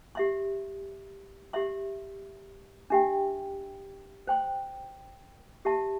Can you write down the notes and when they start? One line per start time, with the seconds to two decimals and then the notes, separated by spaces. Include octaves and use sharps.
0.15 G4 E5 C6
1.53 G4 E5 C6
2.90 D4 G4 E5 G5
4.27 C5 G5 C6
5.65 G4 E5 A5